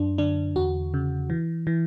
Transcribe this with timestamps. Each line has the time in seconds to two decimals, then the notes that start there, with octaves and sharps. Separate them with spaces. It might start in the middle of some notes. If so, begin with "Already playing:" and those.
Already playing: F#2 D4
0.18 D3 D4
0.56 E2 F#4
0.94 C#3
1.30 E3
1.67 E3